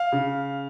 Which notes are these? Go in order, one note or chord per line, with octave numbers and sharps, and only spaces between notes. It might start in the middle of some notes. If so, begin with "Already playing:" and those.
Already playing: F5
C#3